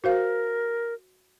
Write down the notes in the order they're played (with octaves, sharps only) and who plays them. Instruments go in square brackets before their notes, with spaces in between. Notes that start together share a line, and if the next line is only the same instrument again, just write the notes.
[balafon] F#4 C5 F5 [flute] A#4